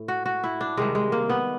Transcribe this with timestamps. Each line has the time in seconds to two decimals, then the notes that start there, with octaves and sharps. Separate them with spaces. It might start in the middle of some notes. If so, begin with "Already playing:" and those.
Already playing: A2
0.08 F#4
0.26 F#4
0.44 E4
0.61 D4
0.77 C3 D#3 G3 G#3
0.95 G#3
1.12 A#3
1.29 B3